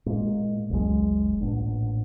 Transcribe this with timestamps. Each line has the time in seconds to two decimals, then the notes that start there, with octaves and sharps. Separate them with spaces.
0.06 A#2 G#3 A#3
0.70 F#1 C#2 F#3 G#3
1.41 A1 A#2 B3 D4